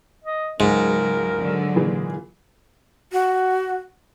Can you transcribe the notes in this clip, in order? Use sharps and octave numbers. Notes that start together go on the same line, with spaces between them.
D#5
C#2 G#2 F#3 A#4
D3 F#3
A#2 E3 G#4
F#4